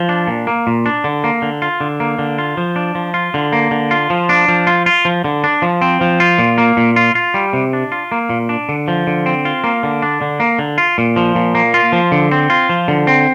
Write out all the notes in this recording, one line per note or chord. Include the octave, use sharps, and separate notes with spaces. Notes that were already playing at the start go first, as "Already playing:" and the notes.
Already playing: F3
D4
A#2
A#3
A#2
D4
D3
A#3
D3
F4
D3
A#3
D3
F4
F3
D4
F3
F4
D3
A#3
D3
F4
F3
D4
F3
F4
F4
F3
D3
D4
F3
C4
F3
F4
A#2
A#3
A#2
F4
F4
G3
C3
D4
F4
A#3
A#2
D4
D3
F3
D3
C4
F4
A#3
D3
D4
D3
A#3
D3
F4
A#2
F3
A#2
A#3
F4
F3
D3
C4
F4
F3
D3
C4